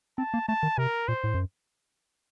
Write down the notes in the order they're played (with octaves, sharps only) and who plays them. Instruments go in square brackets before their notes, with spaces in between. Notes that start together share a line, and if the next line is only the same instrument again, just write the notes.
[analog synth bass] C4 [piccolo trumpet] A5
[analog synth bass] A#3
[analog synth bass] A3 [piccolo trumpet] A5
[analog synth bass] D#3
[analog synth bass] C3 [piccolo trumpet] A#4
[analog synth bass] A#2 [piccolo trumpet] C5
[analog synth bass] A2
F#2